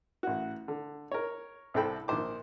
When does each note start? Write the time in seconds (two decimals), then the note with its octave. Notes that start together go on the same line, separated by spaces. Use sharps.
0.23 A1 F#4
0.68 D3
1.11 A#4 C#5
1.74 C2 C3 C4 A4 G5 B5
2.08 A#1 D#3 C5 D6